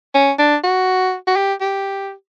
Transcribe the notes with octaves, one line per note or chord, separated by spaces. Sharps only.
C#4
D4
F#4
F#4
G4
G4